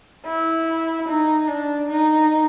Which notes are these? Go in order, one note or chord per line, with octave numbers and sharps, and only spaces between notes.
E4
D#4
D4
D#4